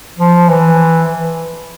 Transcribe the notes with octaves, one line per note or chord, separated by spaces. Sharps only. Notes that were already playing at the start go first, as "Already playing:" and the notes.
F3
E3